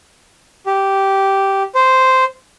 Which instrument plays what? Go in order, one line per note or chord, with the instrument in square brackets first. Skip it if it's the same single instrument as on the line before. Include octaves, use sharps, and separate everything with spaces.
[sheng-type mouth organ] G4
C5